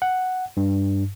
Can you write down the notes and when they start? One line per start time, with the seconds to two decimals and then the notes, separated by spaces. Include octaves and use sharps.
0.02 F#5
0.57 G2